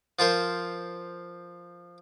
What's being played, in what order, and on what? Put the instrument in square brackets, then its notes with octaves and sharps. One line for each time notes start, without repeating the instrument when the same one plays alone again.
[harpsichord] F3 F4 A#4 C5